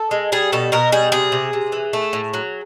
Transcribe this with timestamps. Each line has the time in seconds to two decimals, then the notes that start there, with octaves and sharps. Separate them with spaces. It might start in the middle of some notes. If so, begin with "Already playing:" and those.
Already playing: A4
0.11 G#3
0.32 G3 G#4
0.52 B2 A4
0.72 B2 A#4
0.92 G3 G#4
1.12 C3 G#4
1.32 C3
1.53 C3
1.72 E3
1.93 A3
2.13 A2
2.34 F#3